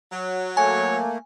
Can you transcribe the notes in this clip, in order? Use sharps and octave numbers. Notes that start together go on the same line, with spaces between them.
F#3
A3 A#3 C#5 G#5